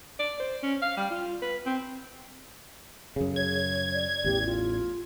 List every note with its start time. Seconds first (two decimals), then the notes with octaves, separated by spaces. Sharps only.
0.19 D5
0.40 C5
0.62 C#4
0.82 F5
0.97 G3
1.10 F4
1.42 B4
1.66 C4
3.16 F#2 C#3 G#4
3.36 C#5 G#6
3.95 D5
4.24 A1 E2 G4
4.46 F4